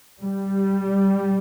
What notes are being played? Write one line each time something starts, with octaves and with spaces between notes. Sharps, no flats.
G3